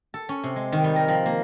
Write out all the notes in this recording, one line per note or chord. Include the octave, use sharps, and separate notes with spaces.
A4
C#4
C3
G#3
D#3
G3
A#4
F3
A#3